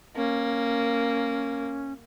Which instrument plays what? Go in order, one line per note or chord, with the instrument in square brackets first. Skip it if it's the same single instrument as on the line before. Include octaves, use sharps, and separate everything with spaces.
[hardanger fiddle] A#3 [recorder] C#4